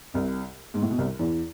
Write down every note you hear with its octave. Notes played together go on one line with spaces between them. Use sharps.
C2 C3
G#2
A2
B2
C2 C3
E2 E3